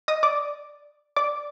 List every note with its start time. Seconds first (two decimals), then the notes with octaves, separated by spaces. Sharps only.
0.08 D#5 D#6
0.23 D5 D6
1.16 D5 D6